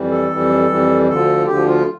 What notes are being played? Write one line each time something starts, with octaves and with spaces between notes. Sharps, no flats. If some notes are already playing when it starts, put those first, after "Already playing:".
Already playing: F2 E3 G3
A4
F2 E3 G3
F2 E3 G3
D2 D3 F3 A4
D2 D3 F3 G4
F4